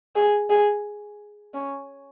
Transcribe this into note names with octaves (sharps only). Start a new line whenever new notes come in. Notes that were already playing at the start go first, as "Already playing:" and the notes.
G#4
G#4
C#4